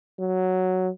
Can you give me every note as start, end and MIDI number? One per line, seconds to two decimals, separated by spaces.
0.19 0.90 54